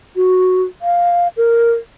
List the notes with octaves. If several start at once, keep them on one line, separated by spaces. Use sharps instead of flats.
F#4
F5
A#4